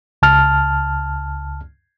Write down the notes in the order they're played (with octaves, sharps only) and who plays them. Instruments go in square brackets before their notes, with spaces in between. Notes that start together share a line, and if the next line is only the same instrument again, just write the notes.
[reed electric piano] C#2 A5 F6